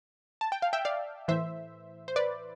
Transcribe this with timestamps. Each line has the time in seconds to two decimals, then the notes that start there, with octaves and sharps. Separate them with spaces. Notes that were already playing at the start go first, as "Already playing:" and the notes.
0.41 A5
0.52 G5
0.62 F5
0.73 E5 G5
0.85 D5 F5
1.28 A2 E3 C5 E5
2.08 C5
2.16 B4 D5